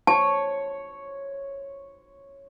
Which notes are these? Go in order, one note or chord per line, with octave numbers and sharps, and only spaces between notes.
C#5 A5